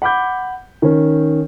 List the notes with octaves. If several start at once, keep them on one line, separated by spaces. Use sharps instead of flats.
F#5 B5 D6 G6
D#3 C#4